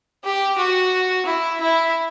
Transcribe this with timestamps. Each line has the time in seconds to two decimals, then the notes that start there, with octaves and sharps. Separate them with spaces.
0.24 G4
0.58 F#4
1.26 E4
1.60 E4